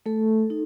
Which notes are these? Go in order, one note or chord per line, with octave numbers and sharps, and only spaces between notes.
A3 A4
D#4